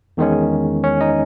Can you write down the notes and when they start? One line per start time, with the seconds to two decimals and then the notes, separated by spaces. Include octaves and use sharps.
0.17 E2 D#3 G#3 C#4
0.84 C#4 C#5
1.01 D#4 D#5